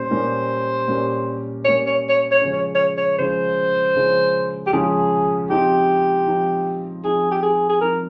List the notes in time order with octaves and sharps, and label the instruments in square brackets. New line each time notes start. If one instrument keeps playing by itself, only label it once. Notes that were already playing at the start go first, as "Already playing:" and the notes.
Already playing: [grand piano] A#2 G3 C#4 G4 [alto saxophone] C5
[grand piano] A#2 G3 C#4 G4 A#4
A#2 G3 C#4 G4 A#4
[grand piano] A#2 G3 C#4 G4 A#4 [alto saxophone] C#5
[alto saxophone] C#5
C#5
C#5
[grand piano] C#3 F3 G#3 C#4
[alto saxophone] C#5
C#5
C#5
[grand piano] C#3 F3 G#3 C#4 [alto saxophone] C5
[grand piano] C#3 F3 G#3 C#4
[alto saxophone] G4
[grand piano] C#3 F3 G#3 C#4 [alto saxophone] G#4
[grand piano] F3 C4 D#4 [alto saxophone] G4
[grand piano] F3 C4 D#4
[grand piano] F3 C4 D#4 [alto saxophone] G#4
[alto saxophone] G4
G#4
G#4
[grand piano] F3 C4 D#4 [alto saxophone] A#4